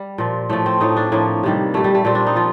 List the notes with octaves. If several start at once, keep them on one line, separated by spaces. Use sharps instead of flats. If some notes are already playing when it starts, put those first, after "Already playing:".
Already playing: G3
A#2 F3
A2 F3 A3
C4
A2 F3 D#4
D4
A2 F3 A#3
C3 D#3 G3
A#2 G3 A3
G3
A3
A#2 G3 C4
D4
D#4
F3 F4